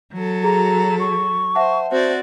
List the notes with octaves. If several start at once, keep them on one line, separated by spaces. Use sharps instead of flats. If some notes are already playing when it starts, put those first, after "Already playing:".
F#3 A4
F#4 G#4 A#5
C#6
C5 E5 F#5 A5
C4 F#4 C5 D5